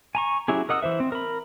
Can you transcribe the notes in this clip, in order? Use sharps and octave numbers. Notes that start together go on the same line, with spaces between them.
G#5 A#5 C#6
F#3 C#4 E4 G4 G#4
A#4 D#5 F#5 D#6 E6
E3 C5 E5
C4
A#4 B5